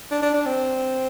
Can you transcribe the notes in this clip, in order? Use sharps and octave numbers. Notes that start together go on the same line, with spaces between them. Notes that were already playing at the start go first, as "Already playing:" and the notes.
D4
D4
D4
C4